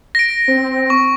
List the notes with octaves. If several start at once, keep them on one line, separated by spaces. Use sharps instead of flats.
A#6 D7
C4
C#6